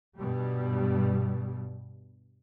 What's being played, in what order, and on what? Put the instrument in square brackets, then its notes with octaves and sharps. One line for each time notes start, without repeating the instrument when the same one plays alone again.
[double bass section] G2 B2 G3